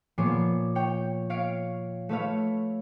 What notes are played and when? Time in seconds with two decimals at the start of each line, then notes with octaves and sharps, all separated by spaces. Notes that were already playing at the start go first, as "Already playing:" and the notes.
0.18 A#2 F3 B3 C#5 D6 C7
0.75 C#5 G5
1.30 C#5 F5 C7 D7
2.09 A3 B4 C#5 F5